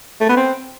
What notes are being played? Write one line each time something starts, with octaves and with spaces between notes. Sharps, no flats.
A3
B3
C4